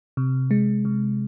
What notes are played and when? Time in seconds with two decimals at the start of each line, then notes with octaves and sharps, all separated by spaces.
0.17 C3
0.51 G#3
0.85 C3